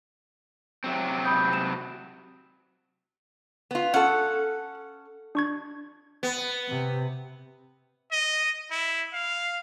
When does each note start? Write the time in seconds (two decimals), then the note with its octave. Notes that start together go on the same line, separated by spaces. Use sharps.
0.84 C3 F#3 C4
1.25 B5 D#6 G6
1.53 E7
3.71 B3 F4
3.94 C#4 A4 F#5
5.35 D4 C#6 G#6
6.23 B3
6.69 C3
8.12 D#5
8.71 E4
9.13 F5